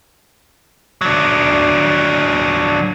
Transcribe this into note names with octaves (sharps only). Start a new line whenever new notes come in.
F#3 D4